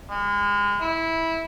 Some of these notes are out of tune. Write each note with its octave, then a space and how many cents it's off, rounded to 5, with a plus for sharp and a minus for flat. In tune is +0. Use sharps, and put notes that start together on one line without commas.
G#3 -35
E4 -15